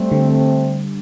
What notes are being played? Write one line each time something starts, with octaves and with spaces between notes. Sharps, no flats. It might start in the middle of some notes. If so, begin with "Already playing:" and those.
Already playing: G3 A3 C4
D3